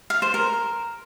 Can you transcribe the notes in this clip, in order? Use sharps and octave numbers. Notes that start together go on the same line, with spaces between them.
F5
C5
A#4